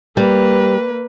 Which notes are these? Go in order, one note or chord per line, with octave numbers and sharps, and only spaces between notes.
G3 A#3 B4